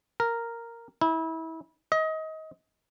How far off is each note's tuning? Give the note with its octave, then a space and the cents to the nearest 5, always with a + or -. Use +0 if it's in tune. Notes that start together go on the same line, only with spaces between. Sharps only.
A#4 -5
E4 -30
D#5 +25